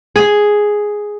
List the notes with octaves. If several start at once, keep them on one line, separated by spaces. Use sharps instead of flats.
G#4